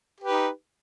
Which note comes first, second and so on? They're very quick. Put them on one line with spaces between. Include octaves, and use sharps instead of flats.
G4 B4 D#4